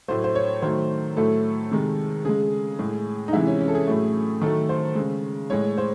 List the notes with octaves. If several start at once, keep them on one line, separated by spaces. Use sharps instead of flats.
A2 F#3 A3 C5
C5
C#5
D#3 F#3 A3 C5
A2 F#3 A3 A4
C3 D#3 G#3
C#3 G#3 G#4
A2 G#3
D#4
C3 E3 G#3 E4
C#4
C#4
A4
G#4
A2 F#3 A3
D#3 F#3 A3 A4
C5
C#3 G#3
A2 G#3 C#5
C5